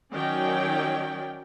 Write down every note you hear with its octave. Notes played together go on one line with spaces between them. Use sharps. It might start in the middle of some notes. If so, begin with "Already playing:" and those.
D#3 F#3 C#4 D5 G5